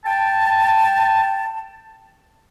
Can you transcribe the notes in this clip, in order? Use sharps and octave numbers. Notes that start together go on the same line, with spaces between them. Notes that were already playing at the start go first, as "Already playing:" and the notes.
G5 A5